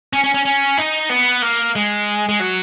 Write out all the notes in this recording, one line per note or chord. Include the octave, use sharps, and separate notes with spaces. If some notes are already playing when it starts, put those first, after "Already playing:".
C#4
C#4
C#4
C#4
D#4
B3
A#3
G#3
G#3
F#3